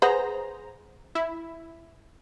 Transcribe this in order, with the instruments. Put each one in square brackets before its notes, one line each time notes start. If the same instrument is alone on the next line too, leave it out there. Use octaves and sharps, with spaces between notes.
[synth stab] G#4 C5 A#5 [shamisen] B4 F#5
[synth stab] E4